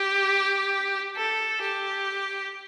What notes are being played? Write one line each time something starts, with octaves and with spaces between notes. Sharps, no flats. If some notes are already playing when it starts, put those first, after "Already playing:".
Already playing: G4
A4
G4